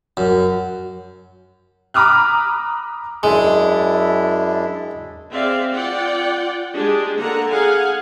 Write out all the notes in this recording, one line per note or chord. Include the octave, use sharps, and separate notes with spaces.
F#2
A#5 B5 D6 D#6 F6 F#6
F#2 G#3 D4 E4
C4 G#4 D5 E5 F5
F4 D5 F#5 G5
G#3 D4 G4 G#4
D3 A#3 F#5 A#5
G#4 F5 F#5 G#5